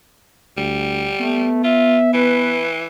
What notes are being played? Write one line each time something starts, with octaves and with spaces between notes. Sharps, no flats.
D2 G3
A3 B3
F4 E5
E3 B4